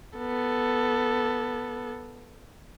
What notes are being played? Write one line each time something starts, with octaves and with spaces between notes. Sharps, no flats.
B3 A4